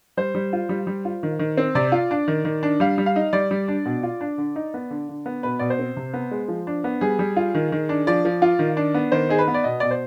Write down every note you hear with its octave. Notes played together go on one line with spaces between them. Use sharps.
G3 C5
G3
F4
G3
G3
F4
D#3
D#3
C4
C3 D5
F4
D4
D#3
D#3
D4
G3 F5
G3
F5
D#4
G3 D5
G3
D4
B2
F4
D4
D3
D#4
B3
D3
D3
B3
B2 B4
B2 D5
C5
C4
C3
B3
G#3
F3
D4
B3
G3 G#4
G3
F4
D#3
D#3
D4
F3 D5
F3
F4
D#3
D4
B3
D#3 C5
D#4 G#4
B4
B3
D5
B2 D#5
B2 D5
C5